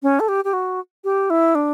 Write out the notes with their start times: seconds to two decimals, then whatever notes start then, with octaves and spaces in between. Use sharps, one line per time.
0.03 C#4
0.20 A4
0.28 G4
0.45 G4
0.53 F#4
1.04 G4
1.30 E4
1.55 D4